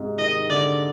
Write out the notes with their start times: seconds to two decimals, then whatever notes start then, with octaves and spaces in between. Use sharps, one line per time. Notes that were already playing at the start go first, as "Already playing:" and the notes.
Already playing: G#2 C3 G#3
0.18 D#3 D#5
0.50 D3 D5